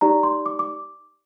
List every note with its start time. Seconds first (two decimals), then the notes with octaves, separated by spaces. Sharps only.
0.01 D#4 G4 D5 A#5
0.23 C6
0.46 D6
0.59 D6